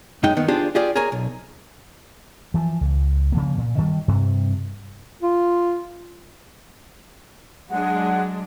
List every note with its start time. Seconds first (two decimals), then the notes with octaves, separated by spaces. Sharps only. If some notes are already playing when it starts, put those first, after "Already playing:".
0.23 F#2 G#3 D#4 G5
0.37 D#3 B3
0.48 D4 F4 G4 G#4 C5 D5
0.75 F4 G4 G#4 D5
0.95 G#4 A#4 C#5 G#5 A#5
1.12 B1
2.54 E3 F3
2.81 C#2
3.32 C#3 F3 A#3
3.58 A#2
3.77 G2 D#3 G3
4.08 G2 C3
5.23 F4
7.70 F#3 G#3 D4 F#5